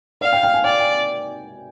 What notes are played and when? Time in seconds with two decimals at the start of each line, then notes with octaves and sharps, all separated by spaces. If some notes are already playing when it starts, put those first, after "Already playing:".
0.21 D5 F5
0.33 G5
0.43 G5
0.54 G#5
0.64 D5 G5
0.79 G5